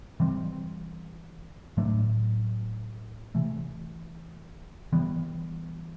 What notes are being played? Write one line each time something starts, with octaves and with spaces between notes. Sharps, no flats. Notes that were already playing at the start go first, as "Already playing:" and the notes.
E3 G3 C4
A2 F#3 A3 D4
C3 E3 A3
E3 G3 B3